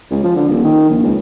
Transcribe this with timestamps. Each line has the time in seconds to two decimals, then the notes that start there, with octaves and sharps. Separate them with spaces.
0.11 C#2
0.24 F3
0.36 D3
0.49 D#1
0.64 D#3
0.90 A#1
1.03 C#2